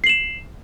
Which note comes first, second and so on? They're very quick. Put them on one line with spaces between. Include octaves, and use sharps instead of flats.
C7 F#7 E7